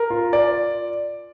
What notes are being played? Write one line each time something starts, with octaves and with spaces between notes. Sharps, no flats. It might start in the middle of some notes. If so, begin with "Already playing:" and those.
Already playing: A#4
F4
D5